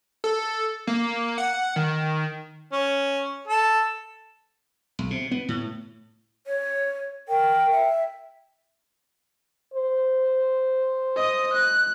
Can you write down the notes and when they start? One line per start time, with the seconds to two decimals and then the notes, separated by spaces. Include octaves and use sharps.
0.24 A4
0.87 A#3
1.38 F#5
1.76 D#3
2.72 C#4
3.47 A4
4.99 B1
5.11 C3
5.31 B3
5.49 A2
6.47 C#5
7.28 A#4 G5
7.71 E5
9.74 C5
11.16 D#5 D#6
11.53 F#6